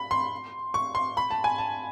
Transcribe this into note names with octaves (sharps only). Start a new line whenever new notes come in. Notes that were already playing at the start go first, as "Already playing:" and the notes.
Already playing: B5
C6
C#6
C6
B5
A5
G#5
A5